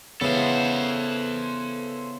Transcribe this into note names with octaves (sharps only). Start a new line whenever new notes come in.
C#3 E3 B3 A4 C5